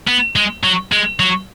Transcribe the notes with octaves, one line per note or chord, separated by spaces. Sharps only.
B3
G#3
F#3
G#3
F#3